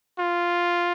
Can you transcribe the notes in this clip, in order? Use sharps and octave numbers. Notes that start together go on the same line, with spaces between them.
F4